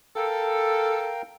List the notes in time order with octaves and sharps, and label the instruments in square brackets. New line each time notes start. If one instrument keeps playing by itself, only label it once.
[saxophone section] A4 [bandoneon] A#4 F5 G5